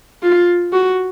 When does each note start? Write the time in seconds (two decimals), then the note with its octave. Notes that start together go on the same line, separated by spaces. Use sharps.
0.23 F4
0.72 F#4